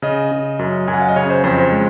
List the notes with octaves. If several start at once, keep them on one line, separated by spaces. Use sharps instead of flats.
C#3 D#5
C#3
F#2
F#2 G#5
F#5
F5
D#5
C#3 C#5
C5
F2 C5
C5
G#3